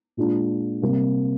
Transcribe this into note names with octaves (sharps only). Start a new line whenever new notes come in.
A#2 G#3 D4 F4
C3 G3 A#3